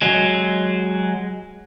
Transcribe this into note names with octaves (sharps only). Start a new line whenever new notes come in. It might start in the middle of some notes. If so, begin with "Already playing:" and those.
F#3 G#3